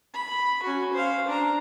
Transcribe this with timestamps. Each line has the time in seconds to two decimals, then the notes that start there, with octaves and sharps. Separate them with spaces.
0.14 B5
0.63 C#4 F#4
0.93 C5 F5
1.28 D4 A#5